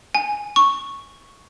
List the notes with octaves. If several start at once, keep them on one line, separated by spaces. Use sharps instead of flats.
G#5
C#6